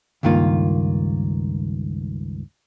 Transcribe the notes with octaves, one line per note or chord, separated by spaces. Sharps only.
C#2 G2 D#3 A#3 F4